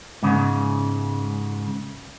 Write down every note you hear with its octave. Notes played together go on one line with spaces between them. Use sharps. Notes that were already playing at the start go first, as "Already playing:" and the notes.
G#2 C#3